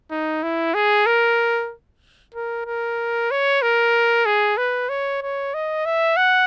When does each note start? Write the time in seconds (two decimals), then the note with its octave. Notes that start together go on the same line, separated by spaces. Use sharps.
0.11 D#4
0.43 E4
0.74 G#4
1.06 A#4
2.34 A#4
2.66 A#4
3.31 C#5
3.62 A#4
4.26 G#4
4.57 B4
4.89 C#5
5.22 C#5
5.54 D#5
5.85 E5
6.17 F#5